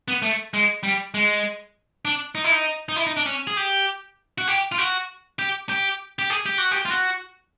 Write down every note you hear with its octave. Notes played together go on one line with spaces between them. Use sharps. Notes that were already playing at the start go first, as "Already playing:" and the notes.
B3
A3
G#3
G3
G#3
D4
D#4
E4
D#4
D#4
E4
D#4
D4
C#4
G#4
G4
F#4
G4
F4
F#4
G4
G4
G4
G#4
G4
F#4
G4
F4
F#4